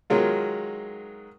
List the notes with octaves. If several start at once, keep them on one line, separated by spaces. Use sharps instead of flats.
D#3 F#3 G#3 F4